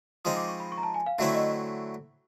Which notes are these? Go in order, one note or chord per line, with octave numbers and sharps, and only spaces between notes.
F3 G#3 C4 D#4 D#6
D6
C#6
B5
C#6
A#5
A5
G#5
F5
D3 F#3 A3 C4 E4 E5
D#5